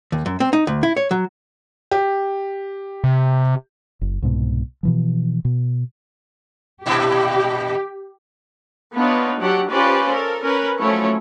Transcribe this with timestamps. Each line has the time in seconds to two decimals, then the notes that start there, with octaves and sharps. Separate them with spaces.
0.12 D#2
0.26 F#2
0.40 C4
0.53 D#4
0.67 D2
0.83 E4
0.97 C#5
1.11 F#3
1.91 G4
3.04 C3
4.01 F#1
4.22 C2 G#2 B2
4.83 B2 E3 F3
5.45 B2
6.86 G2 A#2 E4 G4
8.94 B3 D4 D#4 F4 B4 C#5
9.41 F#3 D4 G4 F#5
9.71 C#4 F4 G4 B4 C5 D5
10.10 A4 A#4
10.42 C#4 A#4 B4
10.79 F3 F#3 A3 C#4 E4 C#5